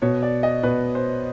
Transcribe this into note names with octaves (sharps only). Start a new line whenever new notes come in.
B2 C#5
D5
D#5
B2 B4
C5